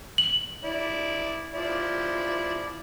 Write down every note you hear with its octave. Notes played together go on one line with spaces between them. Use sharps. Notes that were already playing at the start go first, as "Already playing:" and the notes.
F#7
E4 D5
F3 E4 D5